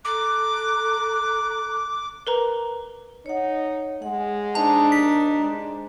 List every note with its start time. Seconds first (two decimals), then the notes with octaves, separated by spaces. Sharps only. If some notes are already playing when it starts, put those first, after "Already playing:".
0.05 A4 A#5 D6 F#6
2.27 A#4 B4 A#5
3.26 D#4 C#5 F#5
4.02 G#3 F#5
4.55 D4 D#4 C5 A5 A#5
4.92 D#2 B6
5.39 G#3